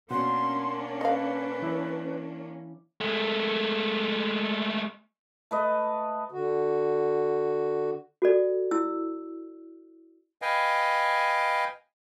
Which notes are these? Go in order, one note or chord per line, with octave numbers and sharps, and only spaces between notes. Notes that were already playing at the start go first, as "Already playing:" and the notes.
B2 A#3 C#4 D4 F#5 C6
B4 D#5 F5
E3 E4 D6
G#3 A3
A3 B4 D#5
D3 F#4
F#4 A4 D5
E4 E6
B4 D#5 F5 G5 G#5